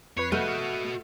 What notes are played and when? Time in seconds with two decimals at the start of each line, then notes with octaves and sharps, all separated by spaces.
0.17 F2 B4 C#5 C7
0.32 A3 F#4 D#5 F#5 F6 G6